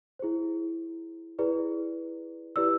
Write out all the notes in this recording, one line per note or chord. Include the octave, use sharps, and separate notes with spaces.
E4 G#4 C5
E4 G#4 B4 D5
E4 G4 B4 D5 E6